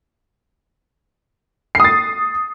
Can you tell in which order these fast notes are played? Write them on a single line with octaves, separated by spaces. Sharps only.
C7 D#6 A6